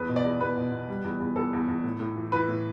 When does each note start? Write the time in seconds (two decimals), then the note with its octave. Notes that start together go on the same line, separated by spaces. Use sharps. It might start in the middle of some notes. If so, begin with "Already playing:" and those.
Already playing: E2 B4
0.09 B2
0.16 D5
0.25 E2
0.41 E2 B4
0.57 B2
0.72 B2
0.89 G3
1.04 E2
1.20 E2
1.36 E2 A4
1.53 E2
1.68 E2
1.84 A2
2.00 A2
2.16 E3
2.32 E3 B4
2.48 A2